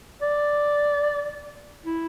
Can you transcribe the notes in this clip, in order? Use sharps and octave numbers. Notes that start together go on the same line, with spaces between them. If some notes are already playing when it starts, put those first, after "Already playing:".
D5
E4